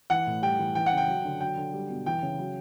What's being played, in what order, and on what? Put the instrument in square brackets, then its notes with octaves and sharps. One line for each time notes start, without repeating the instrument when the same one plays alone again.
[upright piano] E3 [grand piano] F#5
[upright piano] A2
[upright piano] G3 [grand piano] G5
[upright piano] E3
[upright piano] E3 [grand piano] G5
[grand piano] F#5
[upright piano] C#3
[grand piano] G5
[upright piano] F#3
D3
[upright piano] F#3 [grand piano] G5
[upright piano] D3
G3
B2
[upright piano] E3 [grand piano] G5
[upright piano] C#3
F#3